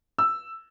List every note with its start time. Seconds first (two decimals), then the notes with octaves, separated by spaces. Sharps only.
0.18 E6